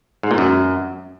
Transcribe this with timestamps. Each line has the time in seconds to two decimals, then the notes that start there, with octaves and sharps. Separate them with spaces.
0.23 G#2
0.31 A#2
0.38 F#2